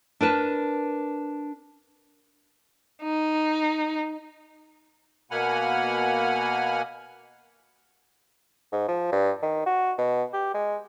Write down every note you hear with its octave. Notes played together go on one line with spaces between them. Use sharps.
D4 A#4 B4 A5
D#4
B2 A#3 F#5 G#5 B5 F6
G#2
F3
G2
D#3
F#4
B2
G4
G#3